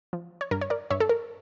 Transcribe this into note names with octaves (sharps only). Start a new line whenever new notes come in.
F3
C#5
G2 A#4
C#5
A#4 D5
G2 C#5 E5
A4
A#4